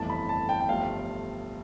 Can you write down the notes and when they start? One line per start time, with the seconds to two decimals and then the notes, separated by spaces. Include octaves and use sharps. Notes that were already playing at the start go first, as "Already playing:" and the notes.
Already playing: G1 F2 E3 A3 A5
0.10 B5
0.29 A5
0.49 G5
0.60 G5
0.69 G1 G2 F3 A3 F5